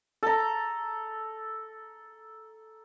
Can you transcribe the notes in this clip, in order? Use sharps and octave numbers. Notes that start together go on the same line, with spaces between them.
A4 A#5